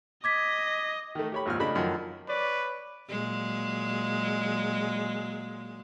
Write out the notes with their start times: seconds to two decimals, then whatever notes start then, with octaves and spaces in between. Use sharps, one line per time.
0.24 D#5 D6 G#6 B6
1.15 D#3 A3
1.32 G4 C#5 B5
1.46 G#1 F2 A#2 F6
1.60 C#3 A3 D4 D#5 B5
1.75 F#2 D#3 F3
2.28 B4 C#5 D5
3.10 A#2 F#3 G#3